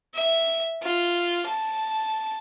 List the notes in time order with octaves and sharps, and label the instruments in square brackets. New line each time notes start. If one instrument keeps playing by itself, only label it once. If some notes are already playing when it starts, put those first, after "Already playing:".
[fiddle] E5
F4
A5